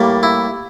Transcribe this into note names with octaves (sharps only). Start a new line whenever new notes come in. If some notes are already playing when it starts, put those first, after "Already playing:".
Already playing: A2 G3 A#3
E4